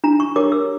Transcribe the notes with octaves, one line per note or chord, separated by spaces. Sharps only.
D4 A#5
C#6
G4 A#4 C#5 D6
E6